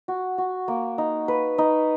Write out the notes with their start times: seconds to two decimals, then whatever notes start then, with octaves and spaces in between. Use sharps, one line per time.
0.08 F#4
0.38 F#4
0.68 A#3
0.98 D#4
1.28 B4
1.58 D#4